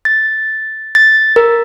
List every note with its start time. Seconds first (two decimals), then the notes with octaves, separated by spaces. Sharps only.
0.05 A6
0.95 A6
1.36 A#4